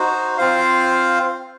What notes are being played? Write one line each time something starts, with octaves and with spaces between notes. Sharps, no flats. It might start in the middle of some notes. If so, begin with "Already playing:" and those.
Already playing: D#4 F#4 C5
C4 F4 C5 F5